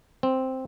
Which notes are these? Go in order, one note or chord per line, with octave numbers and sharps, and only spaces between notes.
C4